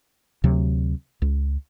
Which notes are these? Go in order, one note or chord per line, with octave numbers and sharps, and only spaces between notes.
D2 C3 F#3
C#2